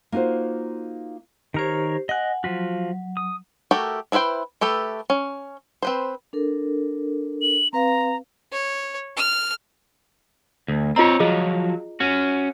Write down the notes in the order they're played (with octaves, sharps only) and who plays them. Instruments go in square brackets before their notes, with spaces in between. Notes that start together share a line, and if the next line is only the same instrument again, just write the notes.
[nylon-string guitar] A#3 D#4 F4 F#4 C5
[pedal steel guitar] D#3 A#4 C#5 [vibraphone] G4 C5
[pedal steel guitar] D#5 F#6 [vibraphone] F#5 G#5
[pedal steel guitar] F3 F4 F#4 [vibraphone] F#3
[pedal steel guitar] D#6
[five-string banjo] A3 F#4 G4 A4 A#4
D4 E4 B4 C5 G5
A3 G4 A4 B4
C#4
C4 B4 C5
[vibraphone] D4 A4 A#4
[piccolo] F#7
[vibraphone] C4 B4 F5 [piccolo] A#5
[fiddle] C#5
F6
[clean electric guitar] D2
[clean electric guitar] C4 C#5 [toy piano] F4 D#5 A#5
[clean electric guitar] F3 F#3 [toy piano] G#4 D#5
[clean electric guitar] C#4 F#4